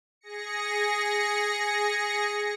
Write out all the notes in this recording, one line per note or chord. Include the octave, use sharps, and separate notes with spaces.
G#4 A#6 C#7